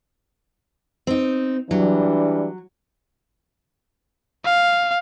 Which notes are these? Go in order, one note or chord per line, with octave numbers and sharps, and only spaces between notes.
C4 D#4
E3 F#3 G3 D4
F5